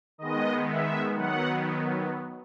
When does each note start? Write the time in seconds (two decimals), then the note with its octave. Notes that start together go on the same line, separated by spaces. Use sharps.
0.18 D#3 G#3 B3 D#5
0.67 E5
1.14 D#3 F#3 B3 F#5